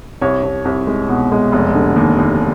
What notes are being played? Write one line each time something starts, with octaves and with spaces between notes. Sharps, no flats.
C2 C#5
C2
C2
G#3
B2
G#3
F1
D3
D#2
D#2